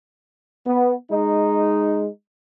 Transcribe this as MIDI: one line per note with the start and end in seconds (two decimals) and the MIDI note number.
0.65 0.92 59
1.09 2.06 56
1.09 2.06 63